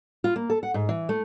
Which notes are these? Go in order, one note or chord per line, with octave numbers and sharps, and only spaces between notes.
F4
A#3
A4
F#5
G#2
E3
A3